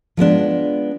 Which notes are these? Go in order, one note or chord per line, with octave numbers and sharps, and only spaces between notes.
F3 G#3 B3 D4